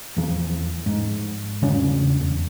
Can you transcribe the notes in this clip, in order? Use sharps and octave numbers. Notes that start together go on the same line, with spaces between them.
E2 F3
G#2
E2 C#3 D4
E2